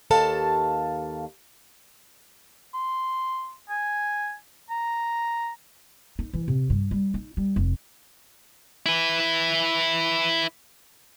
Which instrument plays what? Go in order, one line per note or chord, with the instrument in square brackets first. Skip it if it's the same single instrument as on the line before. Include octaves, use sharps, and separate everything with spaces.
[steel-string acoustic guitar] D#2 A4 F5 A5
[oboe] C6
G#5
A#5
[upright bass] D#4
E3
C3
G2
G3
D#4
G3
F1
[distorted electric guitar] E4 B4